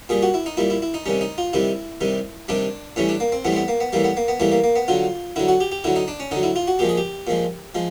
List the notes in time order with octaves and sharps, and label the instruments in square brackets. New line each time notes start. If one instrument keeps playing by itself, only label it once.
[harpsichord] A#2 G3 G#4
F#4
E4
D#4
A#2 G3 E4
E4
E4
D#4
C3 D#3 G3 C#4
D#4
F4
C3 D#3 G3 E4
C3 D#3 G3
C3 D#3 G3 D4
A2 E3 G3 C#4
D4
A#3
C4
A2 E3 G3 B3
C4
B3
A#3
B3
A2 E3 G3 A#3
B3
A#3
B3
A2 E3 G3 A#3
A#3
A#3
B3
D3 F#3 F4
D3 F#3 E4
F#4
G4
G4
D3 F#3 E4
D#4
D4
C#4
D3 F#3 D#4
E4
F4
F#4
A#2 F3 G#3 G4
G#4
G4
A#2 F3 G#3
F3 G#3